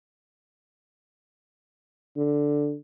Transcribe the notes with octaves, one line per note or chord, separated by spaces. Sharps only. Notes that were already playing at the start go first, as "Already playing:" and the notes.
D3